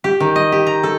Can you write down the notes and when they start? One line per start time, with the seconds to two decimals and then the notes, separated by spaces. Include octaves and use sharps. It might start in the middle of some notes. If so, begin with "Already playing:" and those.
0.04 G4
0.20 D#3
0.36 D#5
0.52 G4
0.67 A#5
0.83 A4